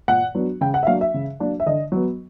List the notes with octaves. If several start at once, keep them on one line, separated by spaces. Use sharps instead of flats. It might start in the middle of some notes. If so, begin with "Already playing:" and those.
A#2 F#5
F#3 B3 D4
C#3 G5
F#5
E5
F#3 A#3 D4 F5
E5
C#3
F#3 A#3 D4
E5
D3 D#5
F#3 B3